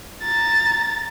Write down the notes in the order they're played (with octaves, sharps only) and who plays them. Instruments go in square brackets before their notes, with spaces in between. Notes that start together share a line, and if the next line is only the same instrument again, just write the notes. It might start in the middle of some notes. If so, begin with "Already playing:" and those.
[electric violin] A#5 A6